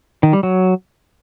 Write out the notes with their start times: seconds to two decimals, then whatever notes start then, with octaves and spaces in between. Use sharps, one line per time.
0.23 D#3
0.33 G3
0.43 F#3